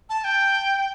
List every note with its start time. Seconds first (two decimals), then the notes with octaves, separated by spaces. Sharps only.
0.10 A5
0.24 G5